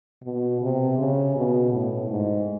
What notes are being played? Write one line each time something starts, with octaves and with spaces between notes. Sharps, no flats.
B2
C3
C#3
B2
A2
G#2